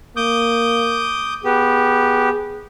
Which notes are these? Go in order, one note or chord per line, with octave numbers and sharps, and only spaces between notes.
A#3 D6 D#6 G6
B3 G4 G#4